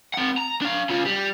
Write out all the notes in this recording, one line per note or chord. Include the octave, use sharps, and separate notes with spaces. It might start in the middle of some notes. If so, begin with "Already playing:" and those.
C4 F#5
A#5
D4 F5
C#3 F4
G3